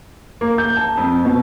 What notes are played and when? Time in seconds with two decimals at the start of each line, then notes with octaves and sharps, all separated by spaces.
0.41 A#3
0.58 G6
0.77 A5
0.97 F2
1.25 B2